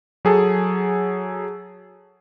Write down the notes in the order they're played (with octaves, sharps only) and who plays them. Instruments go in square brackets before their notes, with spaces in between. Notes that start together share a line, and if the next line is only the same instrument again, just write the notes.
[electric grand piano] F#3 G#4 A4